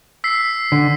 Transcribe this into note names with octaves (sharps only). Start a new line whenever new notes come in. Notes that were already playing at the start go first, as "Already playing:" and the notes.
E6 B6 C7
D3